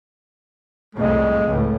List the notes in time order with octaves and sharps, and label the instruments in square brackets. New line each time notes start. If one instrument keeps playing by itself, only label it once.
[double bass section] C2 F2 A2 [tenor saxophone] G#3
[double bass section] C#2 A2